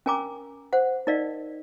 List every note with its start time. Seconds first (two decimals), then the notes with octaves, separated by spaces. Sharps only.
0.06 C#4 A#4 G#5 A#5 D6
0.73 C5 F#5
1.07 D#4 A#4 D5 D#5 F5